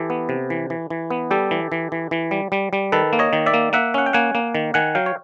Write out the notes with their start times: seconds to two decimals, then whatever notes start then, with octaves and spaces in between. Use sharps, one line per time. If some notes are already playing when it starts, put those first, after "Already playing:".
Already playing: E3 G4 A4
0.10 B3
0.29 C3
0.50 E3
0.70 E3
0.90 E3
1.10 B3
1.31 G3 G4 A4
1.51 E3
1.72 E3
1.92 E3
2.11 E3
2.31 G3
2.52 G3
2.73 G3
2.92 D#3 A4 B4
3.13 A#3
3.19 C#5 D#5
3.33 D#3
3.46 D5 E5
3.54 A#3
3.73 A#3 E5 F#5
3.94 C#4 F#5
4.06 G5
4.13 A#3 F#5 G#5
4.35 A#3
4.55 D#3
4.74 D#3 F#5 G#5
4.95 F#3 F5 G5
5.06 C#5